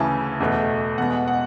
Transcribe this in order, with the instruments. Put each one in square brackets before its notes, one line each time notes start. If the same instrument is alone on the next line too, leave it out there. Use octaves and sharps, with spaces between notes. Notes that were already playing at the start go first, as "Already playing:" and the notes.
Already playing: [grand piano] D2 C#3 E3 A5
E2 B2 A3
E2 B2 G#3 F#5
F#5